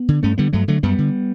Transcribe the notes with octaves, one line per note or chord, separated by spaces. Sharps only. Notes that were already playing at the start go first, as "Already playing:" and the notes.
Already playing: B3
D3
G2 A3 C#4
D3 G3 B3
G2 F#3 A3
D3 F#3 A3
F#2 G3 B3
D3